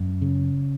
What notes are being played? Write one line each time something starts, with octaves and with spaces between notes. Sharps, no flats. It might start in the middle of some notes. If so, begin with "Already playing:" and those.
Already playing: F#2
C#3